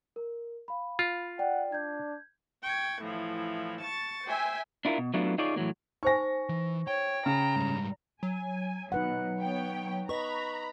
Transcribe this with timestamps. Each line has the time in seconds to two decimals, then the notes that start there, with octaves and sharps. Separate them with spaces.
0.16 A#4
0.68 F5 B5
0.99 F4
1.39 D5 F#5 G5
1.72 D4 G6 G#6
2.64 G5 C#6 G#6
3.04 A2 E3 F3
3.83 A5 C#6 A6
4.27 C5 E5 G5 G#5
4.85 D4 E4 F4 A#4
4.98 B2
5.14 F#3 A3 B3 D4 E4 F4
5.38 D#4 F4 G#4 C#5 D5
5.56 A2 E3 F#3 A#3
6.03 D#4 C5 G#5 C#6 A#6
6.49 E3
6.88 C#5 G5
7.26 C#3 A#5
7.56 G#2 G3
8.23 F#3 G#5
8.92 B2 D#4 B4 F#5
9.40 B3 C#5 G5
10.09 B4 D#5 A#5 B5 C#6